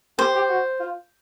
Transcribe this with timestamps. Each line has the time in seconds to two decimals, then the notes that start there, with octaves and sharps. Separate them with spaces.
0.18 G4 C5
0.35 G4
0.49 F#4
0.80 F4